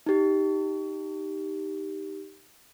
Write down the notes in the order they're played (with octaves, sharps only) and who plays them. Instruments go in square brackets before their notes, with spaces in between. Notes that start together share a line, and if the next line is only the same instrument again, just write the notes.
[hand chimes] D#4 G4